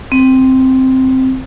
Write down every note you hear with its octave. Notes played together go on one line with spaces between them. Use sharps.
C4